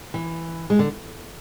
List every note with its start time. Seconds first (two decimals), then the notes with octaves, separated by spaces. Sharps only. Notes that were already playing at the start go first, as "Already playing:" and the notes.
0.14 E3
0.70 G#3
0.79 D3